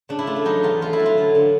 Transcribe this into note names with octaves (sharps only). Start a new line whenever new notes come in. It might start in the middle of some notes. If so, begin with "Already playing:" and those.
C#3 D4
E4
A3 F4
E4
F#3 D#4
E2 F4
A3 F4
E4
F#3
F4
D3
D3